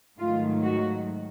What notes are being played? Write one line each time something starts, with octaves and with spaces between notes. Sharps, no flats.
G#2 D#3 F#3 A3 F4
F#4